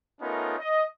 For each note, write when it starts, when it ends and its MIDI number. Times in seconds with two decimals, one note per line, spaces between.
0.21 0.56 57
0.21 0.56 59
0.21 0.56 61
0.21 0.56 63
0.21 0.56 65
0.21 0.56 70
0.58 0.84 75